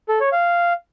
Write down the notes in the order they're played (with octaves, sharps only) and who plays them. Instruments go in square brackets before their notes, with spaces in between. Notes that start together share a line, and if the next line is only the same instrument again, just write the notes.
[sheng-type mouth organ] A4
C#5
F5